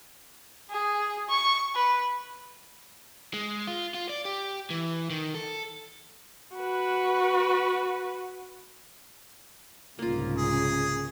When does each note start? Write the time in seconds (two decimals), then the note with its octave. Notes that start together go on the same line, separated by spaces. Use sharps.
0.70 G#4
1.29 C#6
1.75 B4
3.34 G#3
3.68 F4
3.94 F4
4.09 D5
4.25 G4
4.70 E3
5.10 D#3
5.35 A4
6.56 F#4 B4
9.99 C2 G#2 C#3 A#3 F4
10.37 G#4